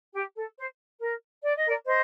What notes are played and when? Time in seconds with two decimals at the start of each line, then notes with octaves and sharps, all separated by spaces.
0.13 G4
0.35 A4
0.56 C5
0.99 A#4
1.42 D5
1.55 D#5
1.66 A#4 D5
1.85 C5 D#5